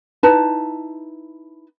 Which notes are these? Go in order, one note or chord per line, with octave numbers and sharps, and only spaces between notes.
D#4 E4 B4 A5